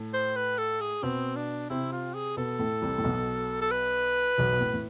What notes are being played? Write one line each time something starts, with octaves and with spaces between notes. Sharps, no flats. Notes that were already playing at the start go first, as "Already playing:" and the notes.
Already playing: A2 A3
C5
B4
A4
G#4
B2 B3 C4
D4
C3 C4 E4
F4
G#4
B2 B3 A4
A2 A3
C2 C3
A2
B1 B2
A4
B4
B1 B2
B2
A2
A2